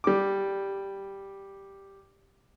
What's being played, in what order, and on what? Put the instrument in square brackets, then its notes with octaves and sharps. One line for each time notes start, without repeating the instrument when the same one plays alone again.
[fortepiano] G3 D6